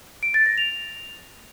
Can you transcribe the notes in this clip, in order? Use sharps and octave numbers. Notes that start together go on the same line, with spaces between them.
D7
A6
A#6
F7